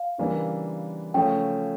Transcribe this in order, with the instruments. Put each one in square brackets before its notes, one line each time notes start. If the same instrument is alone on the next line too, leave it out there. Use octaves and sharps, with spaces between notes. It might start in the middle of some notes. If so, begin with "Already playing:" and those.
Already playing: [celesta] F5
[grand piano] C#3 E3 G3 A#3 D4
[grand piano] C#3 F3 A3 C#4 [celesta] G5